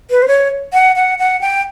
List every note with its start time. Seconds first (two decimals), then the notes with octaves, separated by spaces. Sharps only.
0.11 B4
0.22 C5
0.28 C#5
0.73 F#5
0.96 F#5
1.19 F#5
1.41 G5